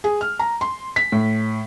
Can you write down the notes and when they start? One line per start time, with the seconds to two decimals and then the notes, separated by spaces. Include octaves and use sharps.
0.04 G#4
0.21 F6
0.39 A#5
0.61 C6
0.96 B6
1.12 A2